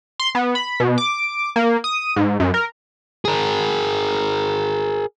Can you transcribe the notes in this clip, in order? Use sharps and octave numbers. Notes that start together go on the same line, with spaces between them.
C6
B3
B5
B2
D6
A#3
D#6
G#2
F#2
A#4
G#4 A#4